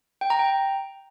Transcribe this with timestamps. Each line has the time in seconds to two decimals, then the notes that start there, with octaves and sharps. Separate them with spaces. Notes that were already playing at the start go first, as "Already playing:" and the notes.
0.21 G5
0.30 A#5
0.39 G5